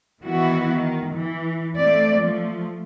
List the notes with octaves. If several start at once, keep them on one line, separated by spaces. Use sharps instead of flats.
D#3 E3 B3 E4 F#4
D#3
E3
A3 C4 D5
F3 A3